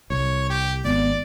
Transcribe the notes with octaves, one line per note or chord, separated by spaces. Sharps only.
C2 C#5
G4
G#1 B3 D5